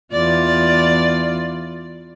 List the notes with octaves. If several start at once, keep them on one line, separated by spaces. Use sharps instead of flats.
E2 F4 D5